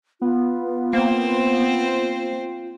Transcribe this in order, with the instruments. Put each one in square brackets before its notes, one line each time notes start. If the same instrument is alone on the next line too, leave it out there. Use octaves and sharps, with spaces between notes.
[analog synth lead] B3 [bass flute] F4
[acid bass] A#3 [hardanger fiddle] C4 C5